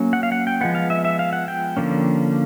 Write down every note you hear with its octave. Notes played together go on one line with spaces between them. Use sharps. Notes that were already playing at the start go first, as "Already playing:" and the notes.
Already playing: F#3 A#3 C#4
F#5
F5
F#5
G5
F3 G#3 B3 F#5
F5
E5
E5
F5
F#5
G5
D3 F3 A#3 C#4